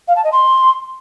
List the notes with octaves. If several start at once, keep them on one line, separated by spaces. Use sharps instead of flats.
F5
A5
D#5
C6